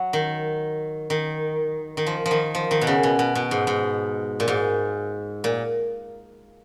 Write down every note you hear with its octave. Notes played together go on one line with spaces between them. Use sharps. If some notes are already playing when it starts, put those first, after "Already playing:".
Already playing: F#3
D#3
D#3
D#3
F3
F3
D#3
F3
D#3
B2
C#3
B2
B2
B2
G#2
G#2
A#2
G#2
A#2